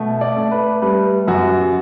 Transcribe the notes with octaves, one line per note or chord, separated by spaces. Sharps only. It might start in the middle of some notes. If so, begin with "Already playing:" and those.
Already playing: B2 A3
D5
A3
B4
G3 B4
F#2 F#4